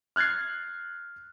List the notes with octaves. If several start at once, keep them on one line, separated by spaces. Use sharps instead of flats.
F6 F#6 G#6 A6 C7